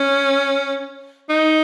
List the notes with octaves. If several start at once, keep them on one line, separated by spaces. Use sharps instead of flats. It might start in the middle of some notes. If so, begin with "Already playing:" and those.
Already playing: C#4
D#4